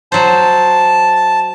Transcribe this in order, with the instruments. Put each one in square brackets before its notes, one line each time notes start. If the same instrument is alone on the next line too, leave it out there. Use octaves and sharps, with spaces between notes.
[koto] F#3 C5 [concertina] A5